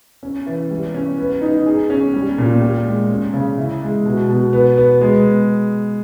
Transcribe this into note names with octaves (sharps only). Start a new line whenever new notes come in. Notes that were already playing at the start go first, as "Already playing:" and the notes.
C#4
E3
G3
C#4
B3
D#4
G#4
C#4
G3
A#2
G4
G#3
C#4
C#3
E4
G#3
B2
B2
B3
B3
G#3